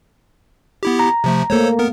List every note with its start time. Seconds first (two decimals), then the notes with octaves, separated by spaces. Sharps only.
0.83 B3 E4 G4
0.99 A#5
1.24 C3 F3 A3
1.50 A3 A#3 A4 C5 C#5
1.79 B3 A#4